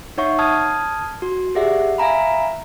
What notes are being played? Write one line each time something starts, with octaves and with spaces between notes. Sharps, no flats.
D#4 C#5 E5 F#5 C#6
A5 D#6 F6 G#6
F#4
G4 G#4 D5 E5 F#5
E5 F5 G#5 A#5 B5